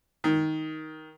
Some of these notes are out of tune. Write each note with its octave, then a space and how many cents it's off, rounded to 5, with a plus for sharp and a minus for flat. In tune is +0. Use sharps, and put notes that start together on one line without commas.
D#3 +10